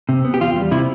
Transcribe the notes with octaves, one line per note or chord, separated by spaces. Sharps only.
C3
B3
G4
E2 F4
G3
C3 E4